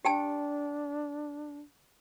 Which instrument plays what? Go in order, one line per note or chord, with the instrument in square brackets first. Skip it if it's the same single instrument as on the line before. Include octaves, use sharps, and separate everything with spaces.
[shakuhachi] D4 [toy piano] G4 G5 A5